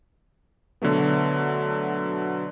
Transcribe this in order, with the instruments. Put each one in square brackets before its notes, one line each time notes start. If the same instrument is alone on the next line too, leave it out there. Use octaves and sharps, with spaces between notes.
[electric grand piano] B2 D3 F#3 A3 B3